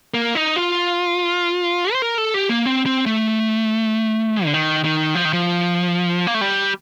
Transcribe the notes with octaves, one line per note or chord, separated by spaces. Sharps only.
A#3
D#4
F4
C5
A#4
A4
G4
A#3
C4
C4
A3
D3
D#3
D#3
F3
D#3
F3
A#3
A3
G3